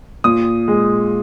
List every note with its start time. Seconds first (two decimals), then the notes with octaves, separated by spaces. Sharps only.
0.24 A#2 D#6
0.68 G#3